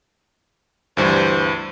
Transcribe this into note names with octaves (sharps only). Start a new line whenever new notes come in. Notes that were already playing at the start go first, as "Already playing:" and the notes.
D2 G2 E3 C5